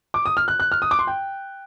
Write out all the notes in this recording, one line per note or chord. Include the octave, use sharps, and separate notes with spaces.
D6
D#6
F6
F#6
F#6
F6
D#6
D6
C6
G5